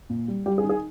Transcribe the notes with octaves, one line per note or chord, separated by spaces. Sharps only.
A#2
G3
G3 G4
G#4
D#3
G#4